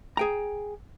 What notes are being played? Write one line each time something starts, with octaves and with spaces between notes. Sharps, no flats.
G#4 G5 A#5